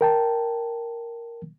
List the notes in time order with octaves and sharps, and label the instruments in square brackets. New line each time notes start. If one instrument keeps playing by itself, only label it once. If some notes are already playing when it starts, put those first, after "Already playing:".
[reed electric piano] A#4 G5 A5